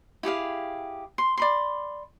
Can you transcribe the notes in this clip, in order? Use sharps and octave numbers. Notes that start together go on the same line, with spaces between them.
E4 G4 G#4 F5
C6
D5 B5 C6